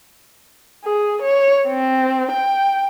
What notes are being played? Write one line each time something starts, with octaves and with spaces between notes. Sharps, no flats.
G#4
C#5
C4
G5